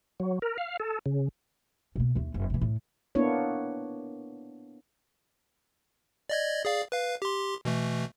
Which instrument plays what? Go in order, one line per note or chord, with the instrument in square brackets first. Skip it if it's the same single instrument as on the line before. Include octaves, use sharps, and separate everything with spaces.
[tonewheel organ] F#3
A#4
F5
A4
C#3
[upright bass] B2 A#3
D#2 A3
F#1
C3 E3
A2
[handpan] A#3 B3 D4 E4 C#5
[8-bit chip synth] D5 D#5 G#6
G#4 D5 F5
B4 F5
G4 C6
B2 E3 A3